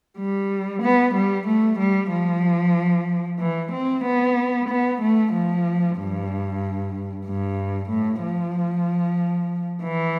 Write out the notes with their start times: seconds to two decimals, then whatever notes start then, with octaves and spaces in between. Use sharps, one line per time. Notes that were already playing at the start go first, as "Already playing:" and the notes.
0.18 G3
0.82 B3
1.15 G3
1.47 A3
1.79 G3
2.11 F3
3.40 E3
3.72 C4
4.04 B3
4.69 B3
5.01 A3
5.33 F3
5.97 G2
7.26 G2
7.90 A2
8.23 F3
9.83 E3